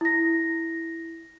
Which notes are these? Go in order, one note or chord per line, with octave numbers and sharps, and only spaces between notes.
E4 A#6